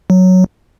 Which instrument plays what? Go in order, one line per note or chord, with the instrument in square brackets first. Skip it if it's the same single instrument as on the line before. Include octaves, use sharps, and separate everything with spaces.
[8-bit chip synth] F#3